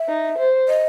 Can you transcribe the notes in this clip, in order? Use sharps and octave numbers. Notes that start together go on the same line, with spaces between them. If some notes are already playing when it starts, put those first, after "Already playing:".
Already playing: E5
D#4
C5
D#5